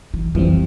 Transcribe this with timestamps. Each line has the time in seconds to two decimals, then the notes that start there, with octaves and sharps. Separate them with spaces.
0.14 E3
0.35 F2 E3 F3 G3 C4